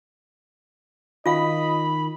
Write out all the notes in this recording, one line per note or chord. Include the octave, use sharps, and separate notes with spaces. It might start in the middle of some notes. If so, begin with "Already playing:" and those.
D#3 F4 D#5 F5 B5